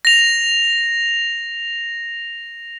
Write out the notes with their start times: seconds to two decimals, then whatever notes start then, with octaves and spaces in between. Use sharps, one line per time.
0.05 A#6 F7